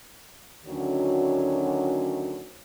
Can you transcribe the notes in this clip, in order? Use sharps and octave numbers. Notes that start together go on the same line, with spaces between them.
D2 D#3 F#3 C#4 F#4